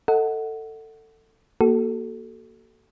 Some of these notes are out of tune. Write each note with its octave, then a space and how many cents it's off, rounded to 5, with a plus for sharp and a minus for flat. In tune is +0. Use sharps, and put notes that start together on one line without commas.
A4 +20 D#5 +25 F#5 +0
A#3 +0 F#4 +35 A4 +0